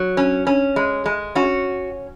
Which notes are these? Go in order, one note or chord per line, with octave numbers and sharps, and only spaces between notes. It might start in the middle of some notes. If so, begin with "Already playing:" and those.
Already playing: F#3
C#4
C#4
G#3
G#3
C#4 F#4